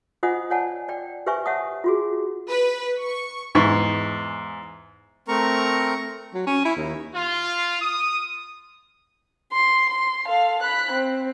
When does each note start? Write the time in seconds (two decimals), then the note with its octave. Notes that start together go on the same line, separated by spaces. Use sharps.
0.23 F4 C5 D#5 F#5 G#5 D#6
0.50 C#5 D5 F#5 G#5 A5
0.88 D5 G5
1.26 G4 B4 C5 E5 G#5 C#6
1.46 C#5 E5 F#5 A5 D#6
1.84 F4 F#4 G#4
2.50 B4
3.01 C#6
3.55 E2 G#2 C#6
5.28 A3 C4 A#4 A#5 C#6
6.34 F#3
6.47 C#4
6.65 E4
6.77 D#2
7.14 F4
7.82 D#6
9.52 C6
9.89 C6
10.27 A4 F5
10.62 B5 F#6
10.92 C4